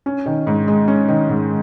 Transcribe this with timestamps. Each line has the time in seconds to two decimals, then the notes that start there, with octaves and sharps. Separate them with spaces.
0.06 C#4
0.26 D#3
0.47 G#2
0.68 G#3
0.88 C#4
1.08 D#3
1.29 G#2